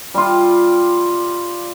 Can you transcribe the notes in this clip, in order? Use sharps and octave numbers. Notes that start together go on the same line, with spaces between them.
G3 F4